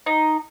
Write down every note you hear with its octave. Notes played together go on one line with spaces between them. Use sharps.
D#4